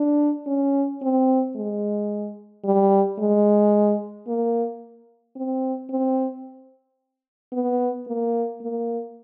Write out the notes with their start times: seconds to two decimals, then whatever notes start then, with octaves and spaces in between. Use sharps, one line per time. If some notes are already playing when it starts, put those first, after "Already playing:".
Already playing: D4
0.47 C#4
1.02 C4
1.56 G#3
2.65 G3
3.19 G#3
4.27 A#3
5.36 C4
5.89 C4
7.53 B3
8.07 A#3
8.61 A#3